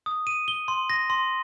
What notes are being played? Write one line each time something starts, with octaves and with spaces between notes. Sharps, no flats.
D#6
D#7
G7
C6
A#6
C6